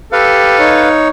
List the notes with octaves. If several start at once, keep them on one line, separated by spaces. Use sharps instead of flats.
G4 A4 B4 F5
D#4 C#5